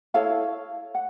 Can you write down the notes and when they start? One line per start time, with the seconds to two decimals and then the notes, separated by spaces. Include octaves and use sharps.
0.14 E4 A4 C#5 F5
0.95 F#5